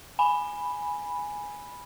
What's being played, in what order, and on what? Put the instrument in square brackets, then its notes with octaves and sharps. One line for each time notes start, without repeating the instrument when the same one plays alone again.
[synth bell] G#5 B5